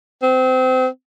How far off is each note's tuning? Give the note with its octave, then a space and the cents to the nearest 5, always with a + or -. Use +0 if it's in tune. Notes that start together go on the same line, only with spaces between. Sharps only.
C4 -25